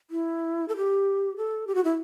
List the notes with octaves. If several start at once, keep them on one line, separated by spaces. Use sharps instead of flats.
E4
A4
G4
A4
G4
F#4
E4